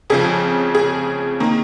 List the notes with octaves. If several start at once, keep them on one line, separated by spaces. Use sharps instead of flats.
F2 C#3 F3 G#4
G#4
D#3 A#3